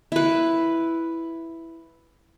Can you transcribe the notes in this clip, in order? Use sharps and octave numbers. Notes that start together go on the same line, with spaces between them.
E4 B4